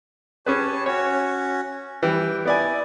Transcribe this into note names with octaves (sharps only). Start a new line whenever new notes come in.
C#4 G4 G#4 B4 C#5 A5
C#4 F#4 C#5
E3 G3 G5
B3 E4 D5 G#5